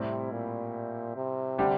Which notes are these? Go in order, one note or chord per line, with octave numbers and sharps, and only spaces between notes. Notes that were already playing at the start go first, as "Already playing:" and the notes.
Already playing: A2 C3 G3 C4 E4
A#2
C3
D3 G3 D4 G4